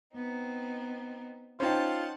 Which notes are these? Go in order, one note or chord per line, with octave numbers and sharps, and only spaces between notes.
B3 C4 D#4
C#4 D#4 F4 C5 F#5 G5 A5